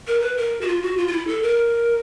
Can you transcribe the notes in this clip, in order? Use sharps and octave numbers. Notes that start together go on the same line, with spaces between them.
A#4
B4
A#4
F#4
F4
F#4
F4
F4
E4
A4
A#4